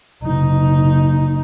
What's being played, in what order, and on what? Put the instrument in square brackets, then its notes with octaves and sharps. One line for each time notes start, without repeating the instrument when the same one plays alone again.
[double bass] F#1 D#4